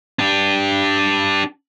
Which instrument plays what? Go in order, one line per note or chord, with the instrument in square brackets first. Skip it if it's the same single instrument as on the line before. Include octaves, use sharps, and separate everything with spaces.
[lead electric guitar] D4 G4